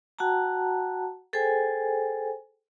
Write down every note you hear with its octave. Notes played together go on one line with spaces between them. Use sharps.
F#4 F#5 G5 A5 A#5
G#4 A4 C5 G5 G#5